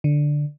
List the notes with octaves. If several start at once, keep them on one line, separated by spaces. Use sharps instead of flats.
D3